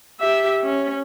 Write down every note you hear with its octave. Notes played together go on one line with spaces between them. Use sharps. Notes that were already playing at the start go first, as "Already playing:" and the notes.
G4 E5
C#4